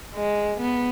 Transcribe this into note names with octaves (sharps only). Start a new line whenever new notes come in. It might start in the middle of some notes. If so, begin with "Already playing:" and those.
G#3
B3